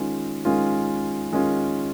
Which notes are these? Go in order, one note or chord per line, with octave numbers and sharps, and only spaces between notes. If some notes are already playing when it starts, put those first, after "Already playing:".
Already playing: D#3 G#3 C#4 F4
D#3 G#3 C#4 F4
D#3 G#3 C#4 F4